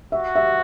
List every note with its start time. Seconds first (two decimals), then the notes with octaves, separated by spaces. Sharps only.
0.12 F#4 E5
0.35 E5